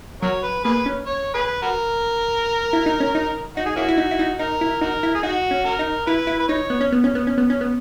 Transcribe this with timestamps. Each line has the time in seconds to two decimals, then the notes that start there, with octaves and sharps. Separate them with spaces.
0.22 F#3 F#4 A#4 C#5
0.43 B4
0.65 A#3 G#4 B4
0.86 C#4
1.06 C#5
1.34 G#4 B4
1.62 F#4 A#4
2.73 E4
2.86 D#4
3.00 C#4
3.15 D#4
3.57 D#4 F#4
3.66 G#4
3.76 A#3 C#4 E4 F#4
3.88 E4
3.98 D#4
4.11 E4
4.19 D#4
4.39 D#4 A#4
4.61 E4
4.81 D#4 F#4 A#4
5.03 E4
5.15 G#4
5.23 D#4 F#4
5.51 C#4
5.65 F#4 A#4
5.79 D#4
6.07 E4 B4
6.27 E4
6.39 B4
6.48 D#4 C#5
6.70 B3
6.81 C#4
6.92 B3
7.04 C#4
7.15 B3
7.27 C#4
7.38 B3
7.50 C#4
7.61 B3